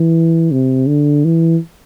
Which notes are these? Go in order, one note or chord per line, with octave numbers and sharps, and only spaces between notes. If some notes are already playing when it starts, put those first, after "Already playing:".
Already playing: E3
C3
D3
E3